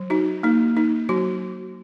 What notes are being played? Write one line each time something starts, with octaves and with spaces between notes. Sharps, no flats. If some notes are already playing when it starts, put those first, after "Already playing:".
Already playing: F#3
D#4 F#4
A#3 D#4
D#4
F#3 F#4